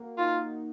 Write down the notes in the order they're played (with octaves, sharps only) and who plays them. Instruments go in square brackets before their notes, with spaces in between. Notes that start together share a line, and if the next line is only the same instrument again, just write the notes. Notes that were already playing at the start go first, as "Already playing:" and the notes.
Already playing: [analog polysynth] A#3 F#4
[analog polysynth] D#4 [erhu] F4